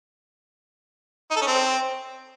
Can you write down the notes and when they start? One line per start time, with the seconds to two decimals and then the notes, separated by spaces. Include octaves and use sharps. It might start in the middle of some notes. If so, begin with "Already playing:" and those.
1.31 D#4
1.36 A4
1.41 C#4
1.47 C4